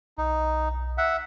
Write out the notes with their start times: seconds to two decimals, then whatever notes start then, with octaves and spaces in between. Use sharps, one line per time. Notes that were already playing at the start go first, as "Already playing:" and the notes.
0.18 B1 D#4
0.98 E5 F#5